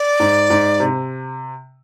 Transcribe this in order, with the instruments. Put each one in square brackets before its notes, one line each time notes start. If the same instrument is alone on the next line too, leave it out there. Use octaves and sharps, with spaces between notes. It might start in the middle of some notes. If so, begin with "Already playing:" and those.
Already playing: [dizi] D5
[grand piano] G#2
G#2
C3